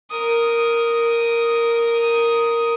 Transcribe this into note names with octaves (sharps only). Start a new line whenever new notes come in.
A#4 D#6